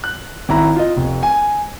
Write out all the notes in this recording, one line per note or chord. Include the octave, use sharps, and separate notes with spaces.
F#6
G#1 E4 A#5
F4 D#5
F1
G#5